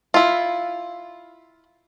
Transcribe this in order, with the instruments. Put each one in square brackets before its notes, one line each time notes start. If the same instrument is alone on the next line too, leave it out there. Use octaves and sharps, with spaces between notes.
[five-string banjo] E4 F4